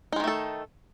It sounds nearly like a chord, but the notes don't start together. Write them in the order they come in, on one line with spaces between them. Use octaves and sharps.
D#4 G#3 D#3 A3 A4